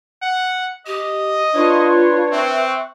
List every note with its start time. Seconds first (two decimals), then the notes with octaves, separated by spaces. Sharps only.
0.23 F#5
0.87 G4 D#5
1.55 D4 F4 B4 C#5 B5 C6
2.32 C4 E5 C#6 F#6